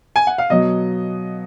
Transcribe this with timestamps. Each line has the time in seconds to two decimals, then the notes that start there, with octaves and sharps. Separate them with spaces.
0.16 G#5
0.27 F#5
0.38 F5
0.50 B2 F#3 D#5